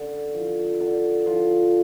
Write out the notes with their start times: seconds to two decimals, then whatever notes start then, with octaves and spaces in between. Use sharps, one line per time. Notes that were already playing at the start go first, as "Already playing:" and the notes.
Already playing: D3
0.34 F3
0.80 D3
1.26 F3